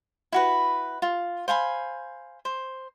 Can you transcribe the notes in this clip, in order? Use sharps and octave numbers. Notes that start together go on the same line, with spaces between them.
E4 F#4 B4
F4
C5 F5 G#5 B5
C5